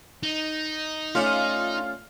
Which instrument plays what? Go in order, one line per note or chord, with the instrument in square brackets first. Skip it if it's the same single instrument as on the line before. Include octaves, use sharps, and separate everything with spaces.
[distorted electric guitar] D#4
[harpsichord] A3 C#4 D5 [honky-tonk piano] F4